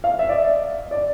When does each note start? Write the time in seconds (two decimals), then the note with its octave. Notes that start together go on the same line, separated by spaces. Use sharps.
0.04 F5
0.19 E5
0.29 D5
0.33 D#5
0.91 D5